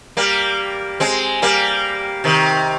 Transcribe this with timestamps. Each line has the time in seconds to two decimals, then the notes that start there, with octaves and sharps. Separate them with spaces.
0.17 G3 A#3
1.00 G#3 C4
1.42 G3 A#3
2.24 C3 D#3